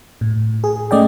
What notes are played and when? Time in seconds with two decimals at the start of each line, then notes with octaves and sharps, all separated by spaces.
0.21 A2
0.64 G#4
0.91 A3 C#4 D5 D#5 G5